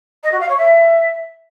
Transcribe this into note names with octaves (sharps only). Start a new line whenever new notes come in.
D#5
F#4
F5
C#5
E5